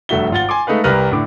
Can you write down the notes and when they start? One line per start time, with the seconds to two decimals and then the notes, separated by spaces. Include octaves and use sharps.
0.09 F1 G2 A3 F#4 E5 G7
0.31 G#1 F4 F#5 A6 G7
0.49 G#5 C6 D6
0.67 G#3 A3 D#4 B4 F5
0.84 C2 G4 A#4 B4 F6 A#6
1.11 A2 D3 D6